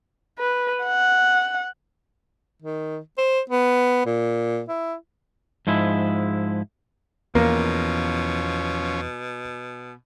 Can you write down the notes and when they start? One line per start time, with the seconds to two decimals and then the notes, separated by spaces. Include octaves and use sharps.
0.39 B4
0.84 F#5
2.62 D#3
3.18 C5
3.50 B3
4.06 A#2
4.69 E4
5.67 G#2 F3 G#3 E4
7.35 E2 B2 F3 A#3 C#4